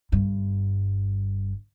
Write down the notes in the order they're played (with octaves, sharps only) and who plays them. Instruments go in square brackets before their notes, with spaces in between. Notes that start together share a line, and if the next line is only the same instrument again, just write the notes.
[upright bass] G1 G2